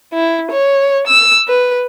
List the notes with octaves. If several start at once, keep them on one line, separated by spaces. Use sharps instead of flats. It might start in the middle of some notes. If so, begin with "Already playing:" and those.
E4
C#5
E6
B4